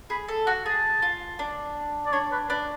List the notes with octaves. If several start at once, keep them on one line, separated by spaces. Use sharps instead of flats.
G#4 B5
A4
F#4 F#5
G#4 A5
F4
D4
D5
D4 C#5
B4
D4 B4